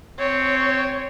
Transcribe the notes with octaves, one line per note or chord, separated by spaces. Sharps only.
C4 C#5